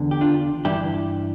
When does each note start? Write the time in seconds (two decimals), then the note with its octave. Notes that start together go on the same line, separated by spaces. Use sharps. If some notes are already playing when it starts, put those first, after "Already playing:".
Already playing: E2 D3
0.11 G4
0.21 D4 F4
0.65 G2 E3 E4 G4